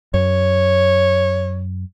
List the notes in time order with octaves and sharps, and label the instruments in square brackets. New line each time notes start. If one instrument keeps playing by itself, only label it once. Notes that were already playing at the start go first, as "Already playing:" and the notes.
[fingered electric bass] F#2 [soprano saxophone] C#5